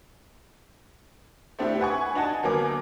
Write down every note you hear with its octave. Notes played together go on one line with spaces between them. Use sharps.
A3 C4 D4 E4 G4
B4 F#5 G#5 C#6
D4 D#4 D#5 F#5 G#5 A5
G1 F#3 A#3 B3 G#5 D6